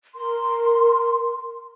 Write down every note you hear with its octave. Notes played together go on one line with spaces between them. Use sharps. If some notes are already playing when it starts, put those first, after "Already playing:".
A#4 C6